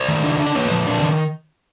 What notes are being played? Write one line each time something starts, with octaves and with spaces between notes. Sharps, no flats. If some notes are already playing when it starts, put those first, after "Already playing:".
Already playing: C5 D5
D#3
D4
D3
D5
A#3 B4 C#5
F3
D4
D#3